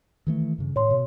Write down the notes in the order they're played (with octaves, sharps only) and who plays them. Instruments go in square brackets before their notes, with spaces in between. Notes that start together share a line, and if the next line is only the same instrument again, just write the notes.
[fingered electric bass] D#3 E3 A3
G2 C#3
[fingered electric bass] A2 [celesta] C#5 C6
[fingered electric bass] B2